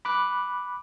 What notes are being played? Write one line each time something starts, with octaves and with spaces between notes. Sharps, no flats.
B5 D6 F#6